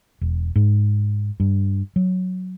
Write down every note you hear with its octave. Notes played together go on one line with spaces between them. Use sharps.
E1
G#2
G2
F#3